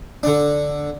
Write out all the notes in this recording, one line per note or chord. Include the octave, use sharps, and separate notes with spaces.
D3 D4